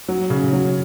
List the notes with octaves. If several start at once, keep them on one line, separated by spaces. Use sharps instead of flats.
F#3
C#3
F#3